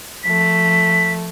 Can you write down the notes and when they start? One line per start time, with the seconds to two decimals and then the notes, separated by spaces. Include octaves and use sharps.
0.24 F3 A3 B6